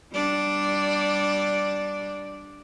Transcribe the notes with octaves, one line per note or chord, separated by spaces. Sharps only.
G3 D4 D5